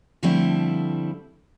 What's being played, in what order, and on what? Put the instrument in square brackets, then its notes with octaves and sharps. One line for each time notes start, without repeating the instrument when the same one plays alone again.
[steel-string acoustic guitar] D3 F3 G3 A3 C4 E4